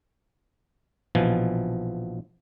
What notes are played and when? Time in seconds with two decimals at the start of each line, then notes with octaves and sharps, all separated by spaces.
1.15 A#1 B2 E3 F3 G#5